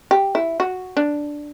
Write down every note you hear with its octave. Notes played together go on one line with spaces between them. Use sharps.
G4
E4
F#4
D4